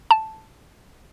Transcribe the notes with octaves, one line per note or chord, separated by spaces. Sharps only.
A5